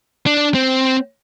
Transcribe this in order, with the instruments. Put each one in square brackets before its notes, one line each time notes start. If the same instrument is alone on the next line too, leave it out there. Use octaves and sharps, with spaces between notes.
[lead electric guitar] D4
C4